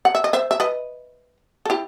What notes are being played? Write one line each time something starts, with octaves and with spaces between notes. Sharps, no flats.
F#5
E5
D#5
C5 E5
E5
B4 D#5
A4
E4 G4